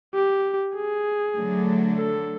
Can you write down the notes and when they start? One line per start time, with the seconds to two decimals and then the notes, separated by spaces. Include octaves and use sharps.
0.14 G4
0.75 G#4
1.36 D3 F#3 A3 D4
1.97 A4